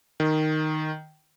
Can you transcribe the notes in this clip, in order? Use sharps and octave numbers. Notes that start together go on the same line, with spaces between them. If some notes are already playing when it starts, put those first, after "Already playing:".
D#3